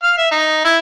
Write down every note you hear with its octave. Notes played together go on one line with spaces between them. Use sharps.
F5
E5
D#4
E4